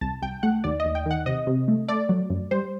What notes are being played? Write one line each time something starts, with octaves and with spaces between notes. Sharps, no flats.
C2 A5
C2 G5
A3 F#5
D#2 D5
D#5
D#2
G5
D#3
F#5
C3 D#5
C3
A3
A3 D5
F#3
F#2
G3 C5